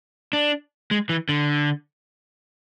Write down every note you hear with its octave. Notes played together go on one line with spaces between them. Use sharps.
D4
G#3
E3
D3